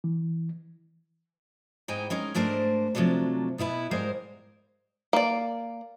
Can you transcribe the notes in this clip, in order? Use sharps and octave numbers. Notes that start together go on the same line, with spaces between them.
E3
G#2 D#4 E4 G5 G#5
G#3 C#4 D#4 A#4
G#2 A3 D4 A#4 C5
C3 F3 F#3 A3 D4
B2 B3 E4 B4
G#2 G3 G#3 A#4 C5 F5
A#3 D5